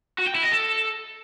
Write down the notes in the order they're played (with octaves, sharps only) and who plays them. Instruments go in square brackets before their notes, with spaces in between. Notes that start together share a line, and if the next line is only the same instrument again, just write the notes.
[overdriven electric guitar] F#4
G5
E4
D#5
A4